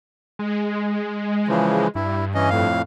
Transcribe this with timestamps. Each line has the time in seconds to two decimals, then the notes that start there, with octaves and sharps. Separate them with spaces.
0.39 G#3
1.48 C#3 E3 F3
1.95 G2 E4
2.35 E3 C#4 D#5
2.50 F2 A2 F5